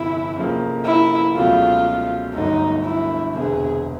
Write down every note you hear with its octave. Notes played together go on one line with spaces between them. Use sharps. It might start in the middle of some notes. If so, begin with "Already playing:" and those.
Already playing: G1 F2 C3 E4
F1 F2 C#3 F3 A#3
E4
C#2 B2 F#3 A3 F4
G1 G2 D3 F#3 A3 D#4
E4
E1 D2 C3 G#4